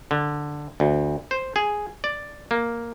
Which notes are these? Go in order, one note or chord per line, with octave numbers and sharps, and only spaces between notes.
D3
D2
C5
G#4
D5
A#3